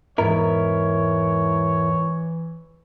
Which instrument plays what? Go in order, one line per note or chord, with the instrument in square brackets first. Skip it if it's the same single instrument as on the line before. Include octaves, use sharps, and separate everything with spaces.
[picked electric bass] E1 G#2 B3 [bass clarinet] E3 [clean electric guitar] E4 A#4 [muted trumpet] C#5